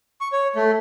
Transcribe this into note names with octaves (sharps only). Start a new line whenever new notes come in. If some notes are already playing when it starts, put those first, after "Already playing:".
C#6
C#5
A3